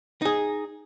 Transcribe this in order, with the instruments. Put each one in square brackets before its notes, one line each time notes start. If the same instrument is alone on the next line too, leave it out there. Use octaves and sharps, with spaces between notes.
[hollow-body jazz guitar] D#4 G#4